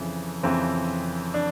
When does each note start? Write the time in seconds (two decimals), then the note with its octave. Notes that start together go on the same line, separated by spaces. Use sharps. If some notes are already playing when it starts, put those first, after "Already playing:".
Already playing: F2 C#3 E3
0.43 F2 C#3 E3 C4
1.34 D4